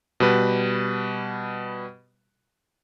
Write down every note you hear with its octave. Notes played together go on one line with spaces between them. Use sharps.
B2 G3 B4